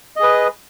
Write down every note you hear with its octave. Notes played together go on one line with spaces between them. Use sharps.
G#4 B4 D#5